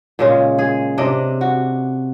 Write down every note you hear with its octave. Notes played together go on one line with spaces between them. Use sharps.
A#2 C#3 G#3
G#4
C3 D4 D#5
F#4